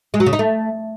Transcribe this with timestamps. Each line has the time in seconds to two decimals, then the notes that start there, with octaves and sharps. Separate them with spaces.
0.14 G#3
0.20 F#3
0.26 C#3
0.33 D#4
0.39 A3